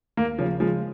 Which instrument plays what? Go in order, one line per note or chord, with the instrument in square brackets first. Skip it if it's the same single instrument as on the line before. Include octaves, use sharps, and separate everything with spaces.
[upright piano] D#2 [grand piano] A#3
[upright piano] C#3 [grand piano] F3
[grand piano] F3 [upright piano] G#3